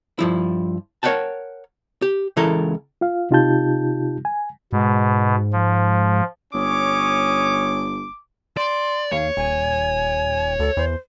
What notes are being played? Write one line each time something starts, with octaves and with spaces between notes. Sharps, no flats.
G2 F3 E4
A#4 C#5 E5 F#5 G5 A5
G4
C#2 C#3 E3 E4 A4 A#4
F4 F5
C3 D#4 F4 G4 A5 G6
G#5
G#2 B2
F3
G1 C#4 C#5 D6 D#6
D5 C6
D#2 C#5 F5
D#1 G#5
D2 A4
E2 C5